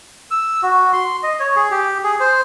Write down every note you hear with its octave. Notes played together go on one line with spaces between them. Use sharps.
E6
F#4
C6
D#5
C#5
G#4
G4
G#4
C5